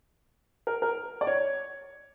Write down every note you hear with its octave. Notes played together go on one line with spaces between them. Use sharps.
A#4
A#4
D5
C#5